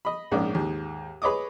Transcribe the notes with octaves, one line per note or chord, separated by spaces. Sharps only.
D#5 B5
A#1 G#2 A#3 C#4 C#5 D5
D#2 G#2
G#4 B4 C#5 D#5 D6 D#6